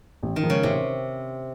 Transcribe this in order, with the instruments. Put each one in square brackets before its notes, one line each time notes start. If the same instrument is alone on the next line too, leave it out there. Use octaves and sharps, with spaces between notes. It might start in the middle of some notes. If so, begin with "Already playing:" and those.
[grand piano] A1
[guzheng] D#3
[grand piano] G#2 F3
[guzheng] C#3
[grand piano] A1 [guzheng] C3